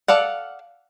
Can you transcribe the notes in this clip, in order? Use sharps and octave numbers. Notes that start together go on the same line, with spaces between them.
A4 D5 F5 F#5